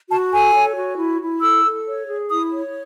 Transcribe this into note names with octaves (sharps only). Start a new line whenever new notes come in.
F#4 A5
A4 G#5
C#5
F#4
E4
E4
A4 E6
A4
C#5
G#4
E4 D#6
C#5